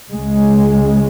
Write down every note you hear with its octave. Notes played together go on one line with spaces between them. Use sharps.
C#2 C#3 G#3